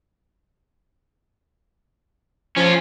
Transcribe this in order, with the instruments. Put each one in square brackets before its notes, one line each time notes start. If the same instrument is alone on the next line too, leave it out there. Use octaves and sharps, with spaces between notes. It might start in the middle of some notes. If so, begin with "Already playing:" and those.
[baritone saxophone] F3 [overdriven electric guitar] C#4 F4